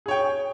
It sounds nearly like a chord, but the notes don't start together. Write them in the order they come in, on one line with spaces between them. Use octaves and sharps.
G#4 C#5 G5